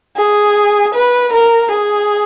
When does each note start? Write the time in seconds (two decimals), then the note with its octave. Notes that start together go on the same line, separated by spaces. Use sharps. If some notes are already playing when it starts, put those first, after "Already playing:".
0.17 G#4
0.94 B4
1.33 A#4
1.71 G#4